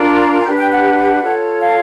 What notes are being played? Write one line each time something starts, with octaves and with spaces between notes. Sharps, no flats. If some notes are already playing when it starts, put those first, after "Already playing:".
Already playing: D4 F4 A#4
G#5
D4 G4 B4 G5
G5
F#5
F4 A4 C#5
F5